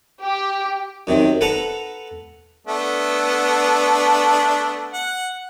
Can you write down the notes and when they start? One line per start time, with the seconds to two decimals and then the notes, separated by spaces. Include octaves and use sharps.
0.22 G4
1.07 F#2 C3 D#3
1.41 A4 B4 F#5 A5 A#5
2.67 A3 B3 D4
4.94 F#5